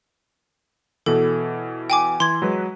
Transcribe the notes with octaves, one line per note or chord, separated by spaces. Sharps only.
B2 E3 A4
G5 G#5 D6
E3 C6 G#6
F#3 G#3 B4